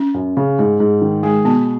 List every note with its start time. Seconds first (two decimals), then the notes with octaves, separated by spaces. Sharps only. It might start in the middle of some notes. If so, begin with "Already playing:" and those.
Already playing: C#4
0.14 F#2
0.37 C#3
0.59 G#2
0.80 G#2
1.02 D#3
1.23 G#3 G#4
1.45 B2 B3